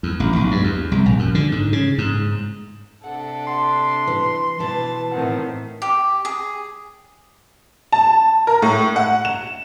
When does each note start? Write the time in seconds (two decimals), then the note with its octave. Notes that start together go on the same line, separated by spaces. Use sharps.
0.03 E2
0.20 A1
0.36 B1
0.51 G2
0.64 E2
0.92 C2
1.06 A#1
1.19 F#2
1.35 D3
1.52 G#2
1.73 C#3
1.98 G#2
3.04 C3 D4 A4 F#5
3.47 C6
4.07 E3
4.60 B2 E3 A5
5.12 A2 D#3 C4 F#5
5.82 G4
6.25 G#4
7.92 A5
8.47 A#4
8.62 A2
8.96 F#5
9.25 E7